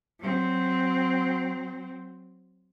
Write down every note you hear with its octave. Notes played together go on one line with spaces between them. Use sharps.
F#3 C4